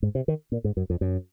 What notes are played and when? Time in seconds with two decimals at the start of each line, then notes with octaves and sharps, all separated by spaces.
0.03 G#2
0.15 C3
0.28 D#3
0.52 A#2
0.64 G#2
0.77 F#2
0.90 F2
1.01 F#2